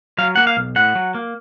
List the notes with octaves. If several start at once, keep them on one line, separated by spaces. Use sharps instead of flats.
F#3 F5
A#3 F#5
F5
B1
A2 F#5
F#3
A#3